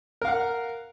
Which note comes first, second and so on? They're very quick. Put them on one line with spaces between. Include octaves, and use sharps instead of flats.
A#4 F5 F#5